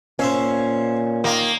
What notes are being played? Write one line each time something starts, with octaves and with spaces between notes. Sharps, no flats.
A#2 C#4 C5 E5 F5
D#3 A#3 F4